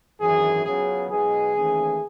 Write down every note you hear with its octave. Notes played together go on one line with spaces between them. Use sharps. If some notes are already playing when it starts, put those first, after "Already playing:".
G#1 F#2 E3 G#4
C#2 C#3 F#3 B3 G#4
B1 B2 G#3 B3 G#4
D#2 C#3 E3 A3